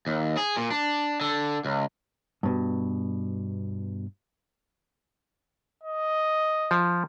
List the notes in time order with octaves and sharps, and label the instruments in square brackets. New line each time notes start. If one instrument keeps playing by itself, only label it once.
[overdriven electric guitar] D#2
G#4
A#2
D4
D3
C#2
[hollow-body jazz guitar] G2 B2
[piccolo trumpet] D#5
[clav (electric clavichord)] F3